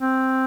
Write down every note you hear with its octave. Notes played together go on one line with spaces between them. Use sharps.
C4